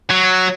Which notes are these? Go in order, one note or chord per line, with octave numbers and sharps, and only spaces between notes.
F#3